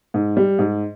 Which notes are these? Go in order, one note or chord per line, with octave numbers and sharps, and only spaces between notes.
G#2
G3
G#2